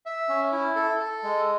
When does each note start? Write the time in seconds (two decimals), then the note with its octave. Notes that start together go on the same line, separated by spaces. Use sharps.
0.06 E5
0.29 C#4
0.52 E4
0.76 A4
0.99 A4
1.23 G#3